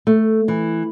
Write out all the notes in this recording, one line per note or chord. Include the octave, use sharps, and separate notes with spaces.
A3
E3